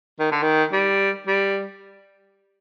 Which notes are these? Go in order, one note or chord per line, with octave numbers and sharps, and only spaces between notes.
D#3
D3
D#3
G3
G3